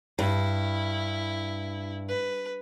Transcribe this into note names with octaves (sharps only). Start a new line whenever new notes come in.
G2 E4
B4